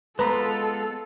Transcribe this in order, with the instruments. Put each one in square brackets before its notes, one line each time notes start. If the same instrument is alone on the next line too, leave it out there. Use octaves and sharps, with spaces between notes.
[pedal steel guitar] G#3 B3 F4 [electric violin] A4 [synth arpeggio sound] B4 A#5 B5